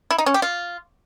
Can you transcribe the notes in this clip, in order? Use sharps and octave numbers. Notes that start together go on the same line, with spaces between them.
E4
D#4
C#4
G4
F4